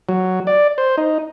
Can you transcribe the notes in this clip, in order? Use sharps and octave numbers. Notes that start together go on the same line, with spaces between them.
F#3
D5
C5
D#4